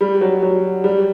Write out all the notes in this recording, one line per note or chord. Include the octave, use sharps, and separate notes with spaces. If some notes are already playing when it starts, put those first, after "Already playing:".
G3
F#3
F#3
G3